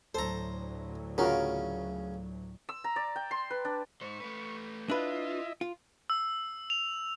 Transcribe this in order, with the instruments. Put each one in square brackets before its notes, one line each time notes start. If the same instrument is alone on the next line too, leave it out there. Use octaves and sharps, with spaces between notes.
[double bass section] D2 A2 F#3 [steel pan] A4 [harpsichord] C5 A#5
[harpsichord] C#3 C#4 [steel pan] F4 F#4 A#4
[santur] E6
A#5
D5
G5
C6
B4
D4
[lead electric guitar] G#2 C5 [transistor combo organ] C#6
[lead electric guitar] A3 B4
[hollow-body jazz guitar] D4 B4 [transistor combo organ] E4 D#5 E5 [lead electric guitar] F4
[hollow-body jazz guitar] F4
[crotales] E6
F7